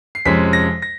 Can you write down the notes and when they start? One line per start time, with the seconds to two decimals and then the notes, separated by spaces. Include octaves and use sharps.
0.15 C7
0.25 F2 C3 F3 G#3 C#4 B6
0.53 A#6
0.82 A#6